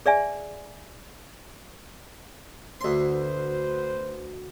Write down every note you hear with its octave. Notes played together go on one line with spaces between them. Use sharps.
G#4 D5 E5 G#5
D2 B4 C5 C6